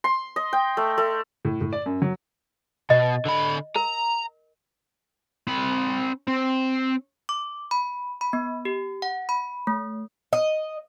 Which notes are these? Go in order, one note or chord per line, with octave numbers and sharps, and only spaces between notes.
C6
D#5
G5
A3
A3
A2
A2
D5
F#2
F#3
B2 D#5
D3 B5
A#4 A#5
C4 B5
C4
D6
B5
B5
B3
G4
F#5
B5
A3
D#5